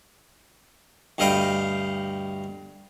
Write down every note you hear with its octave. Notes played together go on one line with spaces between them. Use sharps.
D2 G2 D#5 F5 G5 B5